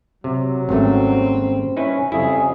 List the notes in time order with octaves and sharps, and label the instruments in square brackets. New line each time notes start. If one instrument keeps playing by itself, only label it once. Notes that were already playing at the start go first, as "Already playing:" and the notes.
[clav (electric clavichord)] C3 [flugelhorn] F#3
[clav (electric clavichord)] G#1 A3 [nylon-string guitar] G3 A#3 C#4 [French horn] C4
[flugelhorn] C#4 [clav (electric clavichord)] D#4 E4 B4
[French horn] F2 [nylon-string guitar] C#3 G3 [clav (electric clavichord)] E4 [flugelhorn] G#4